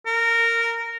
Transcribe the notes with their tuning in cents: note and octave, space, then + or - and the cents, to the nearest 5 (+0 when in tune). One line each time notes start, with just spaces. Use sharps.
A#4 -15